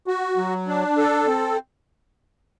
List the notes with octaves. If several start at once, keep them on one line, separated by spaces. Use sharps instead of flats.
F#4
F#3
D4
A4
C4